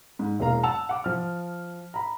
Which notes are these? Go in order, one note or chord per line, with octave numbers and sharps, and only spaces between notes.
G#2
E1 E2 A#3 F5 A#5
F#5 A5 E6 F7
F#5 D6
F3 F6
A#5 B5